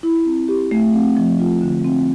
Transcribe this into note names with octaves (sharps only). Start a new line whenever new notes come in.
E4
C4
G4
A3
C4
F3
F4
D3
C4